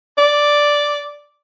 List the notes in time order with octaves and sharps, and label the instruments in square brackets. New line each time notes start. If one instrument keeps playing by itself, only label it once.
[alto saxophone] D5